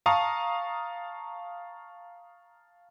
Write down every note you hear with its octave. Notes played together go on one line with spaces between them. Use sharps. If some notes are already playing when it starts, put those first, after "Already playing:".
F5 A5 A#5 C#6 D#6